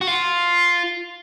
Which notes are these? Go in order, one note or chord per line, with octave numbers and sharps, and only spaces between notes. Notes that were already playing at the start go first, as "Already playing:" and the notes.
F#4
F4